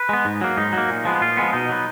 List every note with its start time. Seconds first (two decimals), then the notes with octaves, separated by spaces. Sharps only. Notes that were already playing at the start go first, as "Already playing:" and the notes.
Already playing: B4
0.09 G#3 B3
0.25 G#2
0.41 F#3 A#3
0.57 G#2 D#4
0.73 F#3 A#3
0.89 A#2
1.05 F3 G#3 B3
1.21 A#2 F4
1.37 F3 G#3 B3
1.53 B2 D#4
1.69 F#3 B3